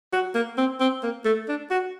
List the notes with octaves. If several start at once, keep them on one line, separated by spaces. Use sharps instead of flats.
F#4
A#3
C4
C4
A#3
A3
D4
F#4